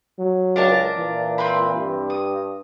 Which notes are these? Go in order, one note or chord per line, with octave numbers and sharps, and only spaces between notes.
F#3
C#2 D4 A#4 A5
A#2 E3
C4 B4 B5
G2
D#6